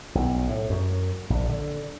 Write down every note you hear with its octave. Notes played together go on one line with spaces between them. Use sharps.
B1
A2
F#2
A#1
D3